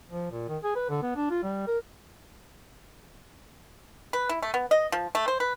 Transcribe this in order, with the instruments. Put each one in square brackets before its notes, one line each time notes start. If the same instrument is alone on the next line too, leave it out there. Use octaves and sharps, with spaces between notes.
[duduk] F3
A#2
D#3
G#4
B4
D3
B3
D4
F4
G3
A#4
[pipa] B4
E4
A3
B3
D#5
F3
A3
C5
B4